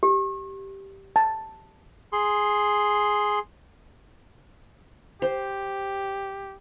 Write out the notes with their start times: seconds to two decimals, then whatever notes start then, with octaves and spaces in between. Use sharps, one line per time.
0.03 G4
1.16 A5
2.13 G#4 C6
5.22 G4 C5